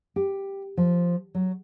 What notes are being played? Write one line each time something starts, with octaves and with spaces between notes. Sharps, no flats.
G4
F3
F#3